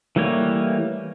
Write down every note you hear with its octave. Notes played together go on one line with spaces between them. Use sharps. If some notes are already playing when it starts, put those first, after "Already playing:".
E3 G3 A3 A#3 C#5